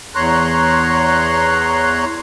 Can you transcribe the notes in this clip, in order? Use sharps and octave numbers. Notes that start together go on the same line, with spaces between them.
E2 C#5 A#5 C6 F#6